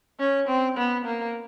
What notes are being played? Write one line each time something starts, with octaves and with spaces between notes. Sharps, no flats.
C#4
C4
B3
A#3